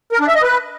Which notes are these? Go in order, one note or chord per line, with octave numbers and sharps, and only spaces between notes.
A#4
D4
E5
D#5
B4